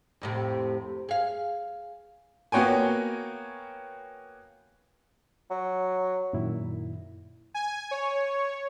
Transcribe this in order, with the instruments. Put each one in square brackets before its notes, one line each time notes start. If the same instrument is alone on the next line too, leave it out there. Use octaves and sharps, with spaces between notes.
[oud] F2 A2 C3
G#4 F5
[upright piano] A#3 B3 F#4 C#5 G5 G#5
[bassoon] F#3
[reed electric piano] F#2 A#2 D#3 E4
[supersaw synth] G#5
C#5